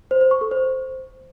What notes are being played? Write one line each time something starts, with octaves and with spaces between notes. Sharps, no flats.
C5
C5
C#6
A4
C5